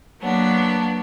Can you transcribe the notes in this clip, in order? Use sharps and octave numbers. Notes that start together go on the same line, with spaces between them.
F#3 A#3 B3 D4